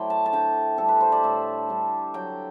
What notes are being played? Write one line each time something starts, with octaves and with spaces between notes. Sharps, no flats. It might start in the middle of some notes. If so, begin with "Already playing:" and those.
Already playing: F#3 A3 E4 C5 D5 G5
A5
A5
D3 G5
G3 D4 A4
B4
C5
D5
A2 E5
G3 D4
F#3 G5